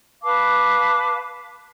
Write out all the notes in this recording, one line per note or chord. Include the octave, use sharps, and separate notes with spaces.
B4 F5 A5 D6